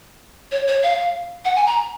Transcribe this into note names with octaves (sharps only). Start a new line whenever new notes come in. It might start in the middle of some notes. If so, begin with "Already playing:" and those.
C#5
C#5
F5
F#5
G#5
A#5